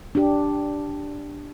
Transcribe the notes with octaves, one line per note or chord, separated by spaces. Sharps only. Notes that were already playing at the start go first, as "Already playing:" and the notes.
D4 G4